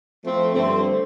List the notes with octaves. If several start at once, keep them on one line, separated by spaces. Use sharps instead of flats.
F3 A3 C4
G2 D3 A3 C4